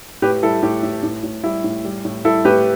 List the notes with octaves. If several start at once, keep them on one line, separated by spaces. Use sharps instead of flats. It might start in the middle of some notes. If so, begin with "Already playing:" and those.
A2 G4 B4
G3 E4 A4
A2 G4
A2
A2
A2
G3 E4
A2
G3
A2
G3 E4 A4
A2 G4 B4